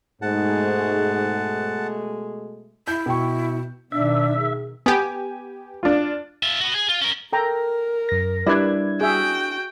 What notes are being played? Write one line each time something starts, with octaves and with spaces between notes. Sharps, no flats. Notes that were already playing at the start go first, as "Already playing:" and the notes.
G#2 B2 G#3 A3 F#5 A5
E4 G6
B2 G5 C#6
B2 D#3 D4 E5
G#4
B3 G4 G#5
D4 F4
F4 E5
B3 F#4
G#4
F4
C#4 A#4
A4 A#4 G5 A#5
F#2 A#6
G3 D4 E4 B4 D5 G#6
F#4 G#4 E5 G5